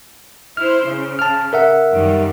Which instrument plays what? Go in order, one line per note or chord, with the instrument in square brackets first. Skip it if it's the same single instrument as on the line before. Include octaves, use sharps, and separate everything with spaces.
[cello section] E4 C5 [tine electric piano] F6
[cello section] C#3
[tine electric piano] A5 F6
A#4 E5 F#5
[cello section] F#2 D#3 G3